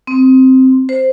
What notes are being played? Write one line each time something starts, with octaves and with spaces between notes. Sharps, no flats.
C4
C5